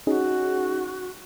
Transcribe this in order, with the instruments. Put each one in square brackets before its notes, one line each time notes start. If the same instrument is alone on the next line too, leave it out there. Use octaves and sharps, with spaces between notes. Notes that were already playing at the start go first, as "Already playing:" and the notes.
[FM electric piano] C#4 D#4 G#4 [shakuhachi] F#4